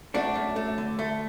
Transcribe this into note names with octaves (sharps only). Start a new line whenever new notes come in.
A3 D4 F#4
F#2
A3
D3
A3